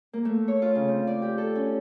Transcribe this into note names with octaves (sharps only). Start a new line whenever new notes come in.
A#3
A3
C#5
F4
C#3
C4
D5
G4
A4
C#4